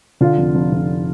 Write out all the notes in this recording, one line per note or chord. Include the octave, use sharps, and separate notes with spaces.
D3 F4
F1
F1
F1